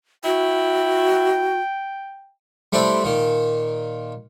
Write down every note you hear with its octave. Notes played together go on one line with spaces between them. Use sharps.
E4 F#4 G5
G3 A3 C4 D4 E4
A#2 D#3